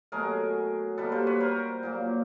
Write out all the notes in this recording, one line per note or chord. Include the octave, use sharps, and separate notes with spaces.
B2 F#3 A3 G#4 A#4
B2 G3 A#3 A4 B4
A#4 C5
B4 C#5
A#4 C5
A#2 F#3 A#3